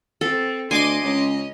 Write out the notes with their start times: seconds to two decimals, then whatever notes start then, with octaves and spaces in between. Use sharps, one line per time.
0.21 C4 A4
0.71 D2 D#5 G#5 C6 D6 D#7
1.04 C#2 C#4 D#5